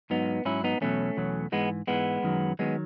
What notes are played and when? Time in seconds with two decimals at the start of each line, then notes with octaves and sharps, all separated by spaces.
0.10 G#2 F#3 B3 D#4
0.45 G#2 F#3 C#4 E4
0.64 B3 D#4
0.81 E2 B2 F#3 A3 C#4
1.17 E2 B2 F#3
1.52 G#2 E3 G#3 B3
1.87 G#2 E3 G#3 B3
2.23 F#2 D#3 F#3
2.59 D#3 F#3 G#3 B3